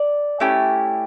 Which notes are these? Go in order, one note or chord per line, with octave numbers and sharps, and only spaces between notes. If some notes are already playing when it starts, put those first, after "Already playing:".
Already playing: D5
A3 C#4 E4 G4